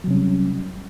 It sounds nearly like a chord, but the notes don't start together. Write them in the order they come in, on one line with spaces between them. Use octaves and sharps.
F#3 C3 C#4 G3